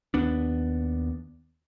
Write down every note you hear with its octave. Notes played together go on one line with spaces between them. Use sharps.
D#2 B3 D4